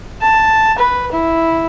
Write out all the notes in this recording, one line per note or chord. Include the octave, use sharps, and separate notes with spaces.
A5
B4
E4